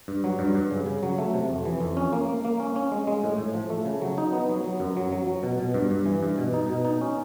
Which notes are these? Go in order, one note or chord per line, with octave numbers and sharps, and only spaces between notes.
G2
F#3
G2
G2
C#3
C#3
F#3
A3
C3
F2
E3
F2
C#4
A#3
A#3
A#3
C#4
C#4
G#3
G#3
A2
A2
F3
A3
C#3
F#3
D#4
B3
F#3
F#3
F#2
F#3
F#3
F#3
B2
B2
G2
G2
E3
G2
B2
D#4
B2
D#4
C#4